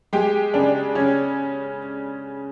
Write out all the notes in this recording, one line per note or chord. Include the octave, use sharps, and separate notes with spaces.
G#3 G4
C#3 D4
C#3 C#4